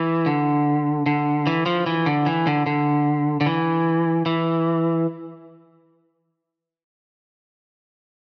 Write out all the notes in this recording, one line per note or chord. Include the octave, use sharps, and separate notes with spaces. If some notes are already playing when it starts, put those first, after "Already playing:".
Already playing: E3
D3
D3
E3
F3
E3
D3
E3
D3
D3
D3
E3
E3